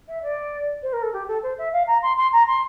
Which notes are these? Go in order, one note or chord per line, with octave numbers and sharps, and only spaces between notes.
E5
D5
C5
A#4
A4
G4
A4
C5
E5
F5
A#5
C6
C6
A#5
C6